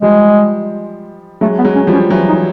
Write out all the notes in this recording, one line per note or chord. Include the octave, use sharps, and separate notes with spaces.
F3 G3 G#3
F#3 G#3 A3
B3
F#3 G#3
C#4
F3 G3
C#4
E3 F#3
D#4